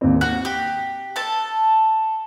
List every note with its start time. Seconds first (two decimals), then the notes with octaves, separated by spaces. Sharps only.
0.01 D#2 C4
0.21 F#4 F#6
0.45 G4
1.16 A4 A5